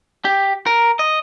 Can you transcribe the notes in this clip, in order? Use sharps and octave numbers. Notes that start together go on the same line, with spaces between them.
G4
A#4
D#5